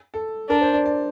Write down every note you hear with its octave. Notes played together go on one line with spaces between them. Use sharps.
A4
D4 A#4
C5
D5
D5